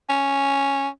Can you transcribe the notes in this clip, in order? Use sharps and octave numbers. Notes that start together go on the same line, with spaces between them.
C#4